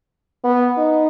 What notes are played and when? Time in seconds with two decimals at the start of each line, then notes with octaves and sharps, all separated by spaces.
0.44 B3
0.78 D#4